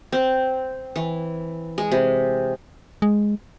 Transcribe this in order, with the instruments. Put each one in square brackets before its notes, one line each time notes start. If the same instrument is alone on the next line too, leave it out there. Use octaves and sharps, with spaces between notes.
[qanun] C4
E3
G#3
C3
[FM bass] G#3